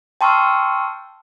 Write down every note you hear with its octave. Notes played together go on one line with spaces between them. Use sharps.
G5 A5 C6 C#6 E6 F6